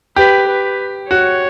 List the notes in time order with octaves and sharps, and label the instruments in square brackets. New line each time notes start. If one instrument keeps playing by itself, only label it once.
[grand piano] G4 [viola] B4
[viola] B4
[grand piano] F#4 [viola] C#5